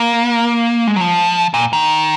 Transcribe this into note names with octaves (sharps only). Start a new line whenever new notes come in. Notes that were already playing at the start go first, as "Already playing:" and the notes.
Already playing: A#3
G#3
F#3
F3
A#2
D#3